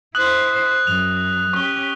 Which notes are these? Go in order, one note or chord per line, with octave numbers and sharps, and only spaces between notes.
E4 C5 D#6 F#6 F#7
F#2 F7
C#4 G4 C#6 D#6 G7